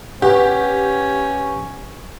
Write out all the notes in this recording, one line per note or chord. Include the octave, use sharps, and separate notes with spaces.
C#4 G4 B4 F#5